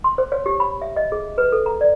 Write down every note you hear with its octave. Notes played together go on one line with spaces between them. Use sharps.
C6
C5
C#5
G4
B5
E5
D#5
G#4
B4
A4
A#5
D5